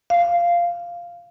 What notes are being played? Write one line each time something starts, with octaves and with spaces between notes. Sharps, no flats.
F5